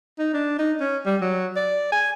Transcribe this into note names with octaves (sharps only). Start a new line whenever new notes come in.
D#4
D4
D#4
C#4
G3
F#3
D5
G#5